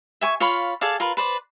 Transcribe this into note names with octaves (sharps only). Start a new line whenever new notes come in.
E5 G#5 C#6
F4 C#5 F5 B5
G#4 A4 D5 F5
F4 A#4 B4
B4 C5 D5